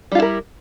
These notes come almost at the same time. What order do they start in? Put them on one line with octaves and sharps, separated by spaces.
G3 F4 E4 A#4